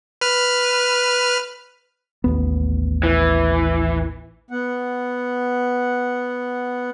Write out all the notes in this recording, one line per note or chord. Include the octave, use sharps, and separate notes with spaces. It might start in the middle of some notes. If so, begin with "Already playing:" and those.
B4 F6
A1 D#2 B3
E3
B3 F#5